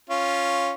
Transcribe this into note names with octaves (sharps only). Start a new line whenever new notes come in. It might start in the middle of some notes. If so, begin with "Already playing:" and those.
C#4 F4